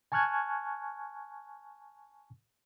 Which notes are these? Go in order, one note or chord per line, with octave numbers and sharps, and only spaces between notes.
G#5 A5 C#6 F6 F#6 G#6